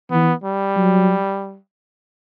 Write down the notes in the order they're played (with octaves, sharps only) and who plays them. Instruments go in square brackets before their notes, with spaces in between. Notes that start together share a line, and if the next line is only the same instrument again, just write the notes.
[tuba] E3 [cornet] B3
[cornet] G3
[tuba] F#3